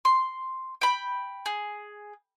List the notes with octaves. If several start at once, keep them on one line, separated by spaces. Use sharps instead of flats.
C6
G5 B5
G#4